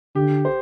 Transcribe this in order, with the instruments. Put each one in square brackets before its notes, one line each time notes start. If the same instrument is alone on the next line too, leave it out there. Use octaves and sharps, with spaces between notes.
[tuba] D3 [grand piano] G4
[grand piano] C5